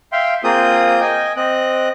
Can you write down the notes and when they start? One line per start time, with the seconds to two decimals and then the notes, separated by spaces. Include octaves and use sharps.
0.12 E5 F5 G5 C6
0.44 A#3 C4 F4 G#4 D#6 G6
1.01 D#5 G5 G#5
1.36 C4 D#5 F#6